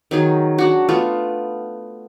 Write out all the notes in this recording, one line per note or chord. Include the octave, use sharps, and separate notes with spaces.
D#3 F#3 G#4
D4 F#4
A3 B3 F4